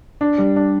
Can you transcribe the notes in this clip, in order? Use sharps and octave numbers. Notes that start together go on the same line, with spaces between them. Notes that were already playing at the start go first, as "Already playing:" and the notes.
D4
G3
D4